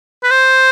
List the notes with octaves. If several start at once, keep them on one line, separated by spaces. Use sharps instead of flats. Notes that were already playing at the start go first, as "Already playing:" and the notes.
B4
C5